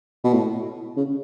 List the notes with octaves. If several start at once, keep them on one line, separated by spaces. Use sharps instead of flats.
B2
A2
C#3